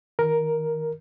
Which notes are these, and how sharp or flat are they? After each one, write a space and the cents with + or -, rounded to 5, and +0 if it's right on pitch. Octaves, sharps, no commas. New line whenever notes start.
D#3 +25 A#4 +5